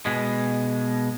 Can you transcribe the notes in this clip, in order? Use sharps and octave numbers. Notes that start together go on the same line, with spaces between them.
B2 G#3